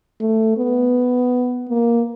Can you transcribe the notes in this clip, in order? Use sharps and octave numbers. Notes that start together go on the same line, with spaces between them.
A3
B3
A#3